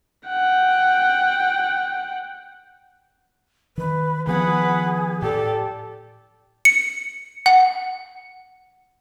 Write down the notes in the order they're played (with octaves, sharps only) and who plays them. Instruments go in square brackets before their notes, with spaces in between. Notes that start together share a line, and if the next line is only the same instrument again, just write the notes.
[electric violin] F#5 G5
[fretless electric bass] D#3 [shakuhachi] B4
[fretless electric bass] D#3 F3 B3 [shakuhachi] G#4 [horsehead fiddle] B4 F#5
[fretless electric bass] A2 [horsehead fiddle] G4 A4 [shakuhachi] D5
[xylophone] C#7
F#5